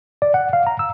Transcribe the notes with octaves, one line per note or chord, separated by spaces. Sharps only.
D5
F#5
F5
A#5
E6